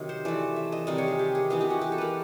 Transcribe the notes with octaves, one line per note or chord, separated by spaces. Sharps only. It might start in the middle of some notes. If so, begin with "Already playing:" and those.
Already playing: C3 D#3 F#3
C5
E3 A3 D5
E5
D#5
C3 D#3 G3 A#3 D5
C#5
G#4
G4
G#4
E3 G#3 B3 G#4
G4
F#4
G4
A4
A#4 B4